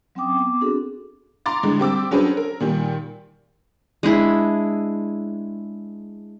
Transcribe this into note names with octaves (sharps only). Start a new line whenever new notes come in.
F#3 C4 C#4 G5 D6 D#6
B3 D6
C4 D4 F#4 G#4 A4
A#5 C6 D6 A6
A2 D3 G#3
G3 C4 D6 E6
F#3 C#4 D4 G#4 B4 C5
A#4
A#2 D#3 G3
G#3 D4 E4 G#4